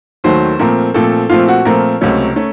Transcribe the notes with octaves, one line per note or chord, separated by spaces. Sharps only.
D#2 D#3 F#3 A3 C5
A#2 F3 A3 C4 A#4
A#2 F3 A3 C4 A4
A#2 F3 A3 C4 F4
F#4
A#2 F3 A3 C4 A#4
C#2 C3 F#3 A3 C#4
A3 C#4